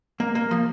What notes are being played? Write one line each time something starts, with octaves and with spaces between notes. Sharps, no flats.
A#3
A#3
F3